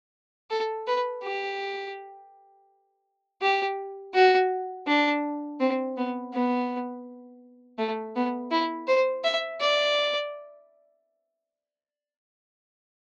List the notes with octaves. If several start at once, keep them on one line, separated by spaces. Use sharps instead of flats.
A4
B4
G4
G4
F#4
D4
C4
B3
B3
A3
B3
E4
C5
E5
D5